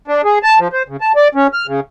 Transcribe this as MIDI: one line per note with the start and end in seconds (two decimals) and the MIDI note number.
0.08 0.22 62
0.24 0.39 68
0.43 0.59 81
0.59 0.68 53
0.73 0.83 72
0.88 0.97 49
1.01 1.12 81
1.16 1.28 74
1.35 1.47 61
1.53 1.67 89
1.67 1.80 49